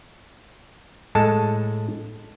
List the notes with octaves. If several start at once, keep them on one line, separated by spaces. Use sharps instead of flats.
A2 G#3 A4 A5